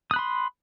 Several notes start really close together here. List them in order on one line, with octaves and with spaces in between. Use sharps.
D#6 F#6 B5 C6